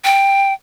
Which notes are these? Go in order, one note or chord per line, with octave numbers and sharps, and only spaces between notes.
G5